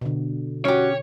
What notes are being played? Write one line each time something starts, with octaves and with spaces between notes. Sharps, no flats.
B2 D3
C#4 F#4 G4 C#5